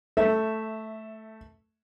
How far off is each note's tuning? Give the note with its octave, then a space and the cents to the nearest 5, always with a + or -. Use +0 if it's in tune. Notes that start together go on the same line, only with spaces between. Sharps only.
A3 +0 E5 -10